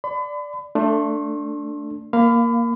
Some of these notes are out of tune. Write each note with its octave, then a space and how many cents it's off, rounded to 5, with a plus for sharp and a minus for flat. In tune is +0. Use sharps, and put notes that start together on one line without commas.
D5 +0 B5 +40
A3 +20 D4 +0 C6 +35
A#3 +0 F5 +0 B5 +30